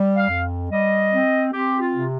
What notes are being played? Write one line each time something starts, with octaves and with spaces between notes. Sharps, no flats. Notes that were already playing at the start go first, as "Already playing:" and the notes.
Already playing: G3
F5
F2
G3 D#5
C4
C4 G4
F4
C3